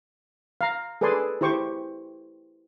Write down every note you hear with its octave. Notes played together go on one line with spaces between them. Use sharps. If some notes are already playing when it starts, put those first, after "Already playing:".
F5 A#5
G#4 A4 B4 D5 G#5 C6
E4 G4 C5 C#6 D6